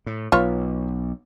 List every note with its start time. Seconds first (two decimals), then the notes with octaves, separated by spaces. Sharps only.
0.06 A2
0.32 B1 F4 B4 C#5